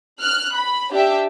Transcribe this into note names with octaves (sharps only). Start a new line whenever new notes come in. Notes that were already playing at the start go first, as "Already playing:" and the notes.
F6 F#6
B5
D4 G4 E5